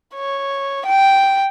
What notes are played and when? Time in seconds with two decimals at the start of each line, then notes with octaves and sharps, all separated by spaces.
0.15 C#5
0.86 G5